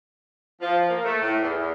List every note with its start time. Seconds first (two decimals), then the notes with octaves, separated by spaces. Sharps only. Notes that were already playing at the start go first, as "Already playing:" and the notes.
0.61 F3
0.88 A#3
1.04 A3
1.21 A2
1.41 E2
1.58 E2